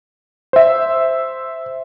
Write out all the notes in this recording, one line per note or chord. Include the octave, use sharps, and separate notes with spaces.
C5 E5